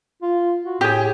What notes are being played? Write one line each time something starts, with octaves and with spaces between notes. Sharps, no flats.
F4
F#4
A2 G4 G#4